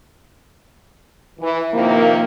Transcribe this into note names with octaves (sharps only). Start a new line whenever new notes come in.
E3
C3 D#3 F3 A#3